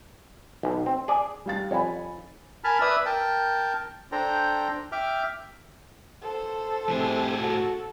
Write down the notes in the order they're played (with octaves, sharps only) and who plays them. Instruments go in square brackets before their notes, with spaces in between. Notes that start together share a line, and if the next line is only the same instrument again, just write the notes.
[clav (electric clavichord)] B1
C4
G#4 D5 G#5
[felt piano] G3 F5 A6
[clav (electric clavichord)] F2 [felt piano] C#5 G#5 B5
[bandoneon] A#4 G#5 A5 B5 F6
B4 D5 E5 D#6 E6
A#4 G5 A5
D4 A4 C5 G5 A#5
E5 G5 D6 F6
[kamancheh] A4 C5
[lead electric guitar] A2 G#4 [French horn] C3
[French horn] F#4 [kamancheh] A4